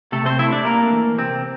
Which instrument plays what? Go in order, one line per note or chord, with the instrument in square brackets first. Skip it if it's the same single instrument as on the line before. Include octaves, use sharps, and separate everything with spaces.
[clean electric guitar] C3 A3 A4
C4 C5
A3 E4 E5
D4 D5
A3 A#3 A#4
E3
C3 C4